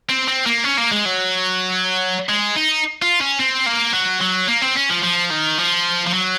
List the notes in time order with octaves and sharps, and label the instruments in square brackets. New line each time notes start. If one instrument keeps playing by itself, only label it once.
[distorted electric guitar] C4
C4
A#3
C#4
A#3
G#3
F#3
G#3
D#4
F4
C#4
C4
A#3
F#3
F#3
A#3
C4
C#4
F3
F3
D#3
F3
F3
F#3